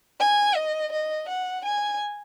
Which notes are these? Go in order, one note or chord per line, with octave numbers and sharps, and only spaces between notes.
G#5
D#5
D#5
F#5
G#5